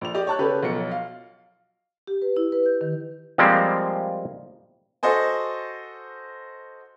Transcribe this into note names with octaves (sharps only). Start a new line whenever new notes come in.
A#1 F7
G4 D5 D#5
C#5 A5 F#6
C#3 C#4 G4 A4 B4
B1 F3 C#7
F5
G4
B4
E4
B4
G6
D#3
F3 G3 G#3 A#3 C4
F#4 A4 C5 D#5 G#5